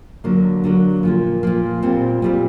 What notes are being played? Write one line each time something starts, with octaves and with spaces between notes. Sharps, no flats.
D3 F#3 A#3
D3 F#3 A#3
A#2 F3 A#3
A#2 F3 A#3
A#2 G3 C4
A#2 G3 C4